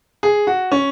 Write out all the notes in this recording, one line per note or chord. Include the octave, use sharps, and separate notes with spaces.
G#4
F#4
C#4